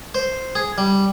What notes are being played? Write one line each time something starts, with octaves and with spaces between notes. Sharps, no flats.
C5
G#4
G3